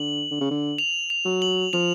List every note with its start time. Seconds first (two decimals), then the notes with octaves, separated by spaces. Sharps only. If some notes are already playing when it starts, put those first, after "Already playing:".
Already playing: D3 F#7
0.31 D3
0.41 C#3
0.51 D3
0.78 F7
1.10 F7
1.25 F#3
1.42 F#7
1.73 F3 F7